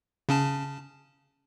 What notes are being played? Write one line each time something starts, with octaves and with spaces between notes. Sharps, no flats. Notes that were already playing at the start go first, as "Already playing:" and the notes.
C#3 C#4 A5